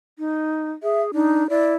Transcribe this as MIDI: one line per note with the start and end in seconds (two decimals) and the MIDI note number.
0.19 0.71 63
0.83 1.11 68
0.83 1.01 76
1.14 1.44 62
1.14 1.47 63
1.50 1.77 64
1.50 1.74 74